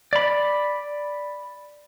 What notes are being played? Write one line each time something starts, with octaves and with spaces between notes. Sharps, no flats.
D5 B5